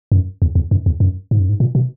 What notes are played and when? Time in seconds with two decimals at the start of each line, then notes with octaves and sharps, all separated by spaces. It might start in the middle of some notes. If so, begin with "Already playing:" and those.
0.12 F#2
0.42 E2
0.55 E2
0.71 F#2
0.86 E2
1.00 F#2
1.31 G#2
1.40 F#2
1.49 G#2
1.60 A#2
1.75 B2